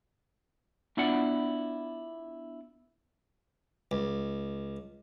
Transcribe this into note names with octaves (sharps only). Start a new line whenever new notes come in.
B3 D4 E4 F4 D5 F#5
C#2